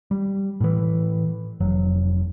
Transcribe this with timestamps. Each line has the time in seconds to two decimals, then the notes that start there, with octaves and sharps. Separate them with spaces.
0.11 G3
0.61 A2 E3
1.60 F1 F#3